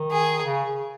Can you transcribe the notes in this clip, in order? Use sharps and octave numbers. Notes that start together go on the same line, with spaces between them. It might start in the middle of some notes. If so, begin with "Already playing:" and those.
Already playing: D#3
G#4
C#3